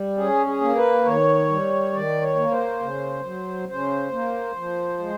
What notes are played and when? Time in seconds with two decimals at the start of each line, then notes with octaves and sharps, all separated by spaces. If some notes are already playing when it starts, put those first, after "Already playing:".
Already playing: G3
0.17 C#4 G#4
0.47 G#4
0.61 A#3
0.76 B4
1.05 D#3 C#5
1.49 G3
1.93 D#3 D5
2.22 C#5
2.36 A#3
2.52 C5
2.80 C#3
3.24 F#3
3.68 C#3 C5
4.11 A#3
4.56 F3
4.99 G#3